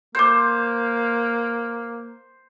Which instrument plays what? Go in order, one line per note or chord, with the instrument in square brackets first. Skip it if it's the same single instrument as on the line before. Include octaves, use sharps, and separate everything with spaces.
[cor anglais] A#3 [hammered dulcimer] C5 [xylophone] D6 G6